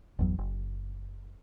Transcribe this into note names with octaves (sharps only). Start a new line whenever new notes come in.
G1 E2 F#3
F#1